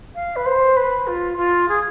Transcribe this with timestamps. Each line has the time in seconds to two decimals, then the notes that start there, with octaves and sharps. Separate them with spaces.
0.15 F5
0.36 B4
0.46 C5
0.77 B4
1.07 F4
1.38 F4
1.69 G#4